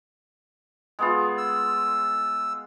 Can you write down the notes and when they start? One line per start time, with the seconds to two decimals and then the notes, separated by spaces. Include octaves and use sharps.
0.99 G#3 B3 F4
1.38 E6